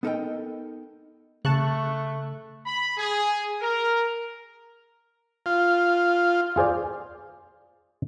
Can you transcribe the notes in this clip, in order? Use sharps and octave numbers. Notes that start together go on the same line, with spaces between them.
B3 D#4 A4 A#4 D#5 G5
C#3 A3 A5 C#6 F#6
B5
G#4
A#4
F4
F4 G#4 C5 D5